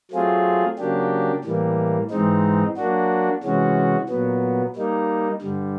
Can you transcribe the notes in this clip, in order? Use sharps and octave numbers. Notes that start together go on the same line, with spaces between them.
F#3 A3 C4 F4 G#4
C#3 F#3 A#3 D4 G4
A2 E3 G3 A#3
G#2 E3 G#3 C4 D#4
F#3 A#3 D4 F#4
C3 E3 G#3 C#4 F#4
A#2 F#3 B3
G3 A#3 D#4
G2 D3 G3